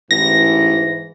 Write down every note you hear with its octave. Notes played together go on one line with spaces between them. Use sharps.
A1 G#2 E3 A#6